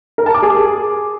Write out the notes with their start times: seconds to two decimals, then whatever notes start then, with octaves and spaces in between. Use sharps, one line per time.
0.18 A#4
0.26 A5
0.34 D6
0.43 G#4